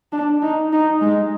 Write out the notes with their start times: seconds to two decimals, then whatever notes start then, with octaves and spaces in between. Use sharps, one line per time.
0.12 D4
0.42 D#4
0.72 D#4
1.01 G#3